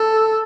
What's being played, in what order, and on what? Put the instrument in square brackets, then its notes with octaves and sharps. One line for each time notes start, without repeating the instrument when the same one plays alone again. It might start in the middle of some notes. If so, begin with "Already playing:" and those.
Already playing: [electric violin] A4